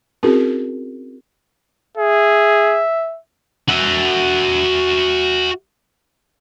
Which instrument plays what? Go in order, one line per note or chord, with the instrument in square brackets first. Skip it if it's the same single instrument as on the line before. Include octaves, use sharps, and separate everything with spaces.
[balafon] C4 C#4 E4 F#4 G#4 A#4
[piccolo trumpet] G#4 [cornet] E5
[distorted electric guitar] F#4 E5